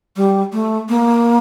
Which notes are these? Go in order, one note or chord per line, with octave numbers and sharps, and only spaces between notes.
G3
A3
A#3